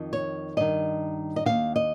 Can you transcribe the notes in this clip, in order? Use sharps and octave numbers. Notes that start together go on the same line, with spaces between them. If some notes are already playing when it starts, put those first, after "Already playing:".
Already playing: F2 D#3
C#5
G2 D#3 D#5
D#5
D#2 D#3 F5
D#5